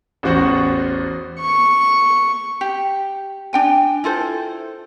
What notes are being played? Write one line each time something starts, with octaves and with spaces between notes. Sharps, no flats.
A1 E2 F#4 C5 F#5 C#6
C#6
G4
D4 G5 G#5
E4 F4 A4 C5